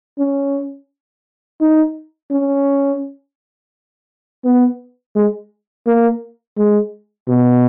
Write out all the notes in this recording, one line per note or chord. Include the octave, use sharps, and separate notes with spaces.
C#4
D#4
C#4
B3
G#3
A#3
G#3
B2